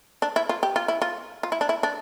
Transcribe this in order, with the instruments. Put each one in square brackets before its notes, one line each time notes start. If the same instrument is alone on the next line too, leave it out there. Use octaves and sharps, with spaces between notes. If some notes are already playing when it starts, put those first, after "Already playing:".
[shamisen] D4
E4
F4
G4
F4
E4
F4
F4
E4
D4
E4
D4